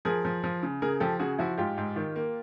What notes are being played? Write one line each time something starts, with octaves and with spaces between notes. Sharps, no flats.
F3 G#4 A#4
F3
F3
C#3
C#3 G#4 A#4
F3 G4 A4
C#3 F#4 G#4
F3 E4 F#4
G#2 F4 G4
G#2
D#3
A#3